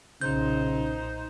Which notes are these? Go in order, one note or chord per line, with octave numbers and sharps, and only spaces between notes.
B1 A#2 C#3 D#4 C5 G6